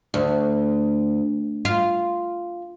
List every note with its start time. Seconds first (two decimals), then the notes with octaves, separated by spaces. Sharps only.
0.14 D2
1.65 F4